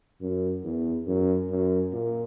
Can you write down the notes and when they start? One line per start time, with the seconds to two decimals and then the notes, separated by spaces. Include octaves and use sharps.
0.21 F#2
0.64 E2
1.07 F#2
1.50 F#2
1.93 A#2